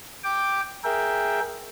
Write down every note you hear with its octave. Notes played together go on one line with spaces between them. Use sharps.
G5 D6
G#4 A#4 E5 G5